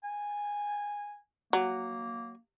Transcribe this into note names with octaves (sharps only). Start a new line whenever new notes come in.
G#5
F#3 A#3